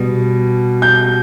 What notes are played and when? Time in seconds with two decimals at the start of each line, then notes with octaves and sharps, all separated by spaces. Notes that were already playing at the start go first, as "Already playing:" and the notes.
Already playing: B2 G3
0.82 G6